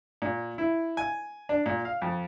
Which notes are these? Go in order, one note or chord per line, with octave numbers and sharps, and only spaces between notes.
A#2
E4
G#5
D4
A#2
F5
F2